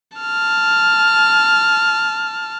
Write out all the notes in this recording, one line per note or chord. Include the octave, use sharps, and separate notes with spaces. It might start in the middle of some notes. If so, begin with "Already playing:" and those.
A5 F6